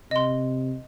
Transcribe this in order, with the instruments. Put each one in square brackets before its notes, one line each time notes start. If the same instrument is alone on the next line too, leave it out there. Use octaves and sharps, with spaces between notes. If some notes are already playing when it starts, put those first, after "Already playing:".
[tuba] C3 [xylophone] D#5 C6